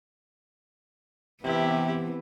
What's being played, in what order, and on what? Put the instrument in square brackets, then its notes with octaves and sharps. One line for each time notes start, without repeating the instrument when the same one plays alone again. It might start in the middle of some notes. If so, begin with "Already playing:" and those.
[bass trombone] C3 [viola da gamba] E3 [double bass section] B3 C4 [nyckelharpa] E4 G4